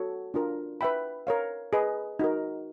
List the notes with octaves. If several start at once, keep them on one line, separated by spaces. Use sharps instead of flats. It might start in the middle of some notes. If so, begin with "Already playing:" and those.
Already playing: F#4 A4 C#5
D4 F4 A#4
B4 E5 G5 B5
A#4 C#5 F5
G#4 B4 D#5
D#4 F#4 A#4